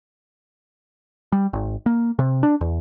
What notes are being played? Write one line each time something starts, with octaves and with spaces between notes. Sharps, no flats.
G3
G#1
A#3
C3
D4
E2